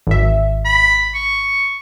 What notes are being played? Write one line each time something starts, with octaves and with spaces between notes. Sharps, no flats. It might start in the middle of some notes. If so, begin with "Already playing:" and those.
G#1 E5
B5
C#6